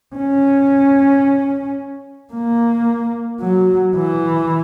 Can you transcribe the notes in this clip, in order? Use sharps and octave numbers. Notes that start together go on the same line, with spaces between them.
C#4
A#3
F#3
E3